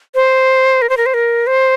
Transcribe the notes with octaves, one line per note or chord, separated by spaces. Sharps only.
C5
A#4
C5
A#4
C5
A#4
C5